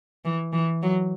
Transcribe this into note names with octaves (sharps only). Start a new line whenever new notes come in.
E3
E3
F#3